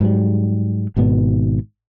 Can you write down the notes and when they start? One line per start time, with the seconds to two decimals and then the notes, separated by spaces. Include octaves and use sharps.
0.01 G#2 F#3 G3
0.96 G#1 G#2 B2 B3